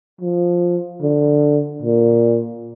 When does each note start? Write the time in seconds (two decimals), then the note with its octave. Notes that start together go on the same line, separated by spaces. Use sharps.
0.21 F3
1.02 D3
1.82 A#2